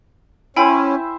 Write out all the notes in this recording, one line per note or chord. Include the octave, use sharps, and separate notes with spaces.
C#4 E4 C5 E5 G5 G#5 B5